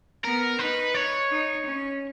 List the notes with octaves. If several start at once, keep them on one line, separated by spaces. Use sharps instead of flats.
B3 A#4
D#4 B4
C#5
D#4
C#4